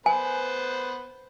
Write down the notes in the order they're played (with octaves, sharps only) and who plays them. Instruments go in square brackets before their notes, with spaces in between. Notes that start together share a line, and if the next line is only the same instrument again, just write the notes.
[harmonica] B3 B4 C5 [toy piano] G#5